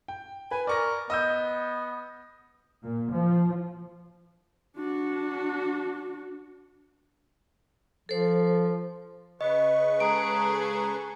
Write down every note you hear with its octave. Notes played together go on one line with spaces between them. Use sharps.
G5
B4 G#5
A#4 D5 C#6 A#6
B3 D#5 E6 G6
A#2
F3
D4 F#4
F3 A4 C5
C#3 B4 D#5 C#6
G#3 G#4 A4 A#5 D#6 D7